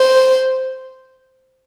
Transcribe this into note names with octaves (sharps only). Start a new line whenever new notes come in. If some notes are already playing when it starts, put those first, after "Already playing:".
Already playing: C5